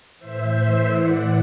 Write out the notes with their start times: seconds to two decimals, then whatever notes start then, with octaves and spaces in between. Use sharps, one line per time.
0.18 A2 E3 C5 E5
0.91 D5 F#5